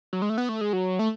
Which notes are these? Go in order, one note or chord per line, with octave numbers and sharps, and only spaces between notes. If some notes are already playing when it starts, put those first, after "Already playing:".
F#3
G#3
A3
B3
A3
G#3
F#3
A3